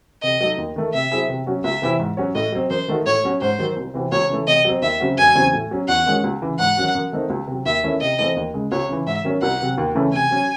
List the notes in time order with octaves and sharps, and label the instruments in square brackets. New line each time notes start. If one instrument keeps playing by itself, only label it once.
[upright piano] C3 [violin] D#5
[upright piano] F#3 A3 D#4
D#2
D#3 A3
[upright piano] C3 [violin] E5
[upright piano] F#3 C4 E4 G#4
C3
F#3 C#4 F#4
[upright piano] C#2 [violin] E5
[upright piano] C3 E3 C4 E4
G#2
F#3 C#4 F#4 C#5
[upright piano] A2 [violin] D#5
[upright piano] F#3 C4
[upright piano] F#2 [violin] C5
[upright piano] D#3 A3 D#4 F#4
[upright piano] A2 [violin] C#5
[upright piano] F#3 C#4 F#4
[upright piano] G#2 [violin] C5
[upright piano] D#3 F#3
C2
C3 E3 C4 F#4
[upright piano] C#2 [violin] C#5
[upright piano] C#3 E3 A3
[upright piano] C3 [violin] D#5
[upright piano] F#3 C4
[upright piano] D#2 [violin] E5
[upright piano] C#3 F#3 C4 F#4
[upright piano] E1 [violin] G#5
[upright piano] E2 C#3 F#3 C4
A2
F#3 C#4
[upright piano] E2 [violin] F#5
[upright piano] D#3 G#3 C#4 F#4
C#2
C#3 E3
[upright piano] G#2 [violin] F#5
[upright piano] D#3 F#3 C#4 F#4
F#2
D#3 A3 C4 D#4
C#2
C3 F#3
[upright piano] D#2 [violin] E5
[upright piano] D#3 A3 C#4 E4
[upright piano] C3 [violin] D#5
[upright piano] E3 A3 C4
D#2
C#3 G#3
[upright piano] C#2 [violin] C#5
[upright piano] C#3 E3
[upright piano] G#2 [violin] E5
[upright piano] D#3 F#3 C#4
[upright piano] C2 [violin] F#5
[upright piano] C3 F#3
D#2
C#3 E3 A3 C#4
[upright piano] C3 [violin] G#5
[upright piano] F#3 C#4